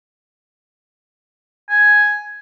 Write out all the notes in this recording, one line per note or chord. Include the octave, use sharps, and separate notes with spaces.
G#5